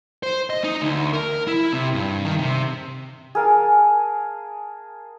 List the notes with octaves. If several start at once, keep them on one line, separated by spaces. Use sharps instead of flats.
C5
D#5
D#4
D2
A#4
E4
C3
G2
D#3
C3
G#4 A#4 F5 A5